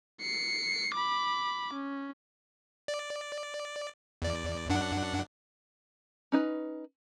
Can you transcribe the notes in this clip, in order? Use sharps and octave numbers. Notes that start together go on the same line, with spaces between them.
C7 C#7
B5 D6
C#4
D5
E2 D5
F#2 D4 F#5
C#4 D#4 B4